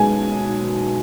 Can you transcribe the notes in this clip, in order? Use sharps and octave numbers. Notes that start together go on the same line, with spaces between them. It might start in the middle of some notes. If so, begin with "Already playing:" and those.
Already playing: B1 B2 G#3 G#5